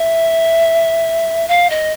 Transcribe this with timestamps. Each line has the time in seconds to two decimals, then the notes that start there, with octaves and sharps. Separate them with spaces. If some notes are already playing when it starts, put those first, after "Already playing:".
Already playing: E5
1.48 F5
1.70 D#5